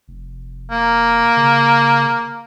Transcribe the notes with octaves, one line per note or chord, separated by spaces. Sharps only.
F1
A#3
C#3